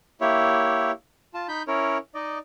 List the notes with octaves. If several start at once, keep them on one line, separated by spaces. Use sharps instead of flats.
A#3 E4 G4 C#5 E5
F4 A5
D#4 B5 G6
C#4 E4 A#4 C#5
D#4 D5 D#5